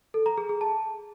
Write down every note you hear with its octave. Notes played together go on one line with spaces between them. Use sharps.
A4
A#5
G#4
G#4
A5